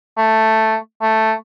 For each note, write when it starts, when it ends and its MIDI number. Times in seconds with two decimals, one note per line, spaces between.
0.17 0.76 57
1.02 1.33 57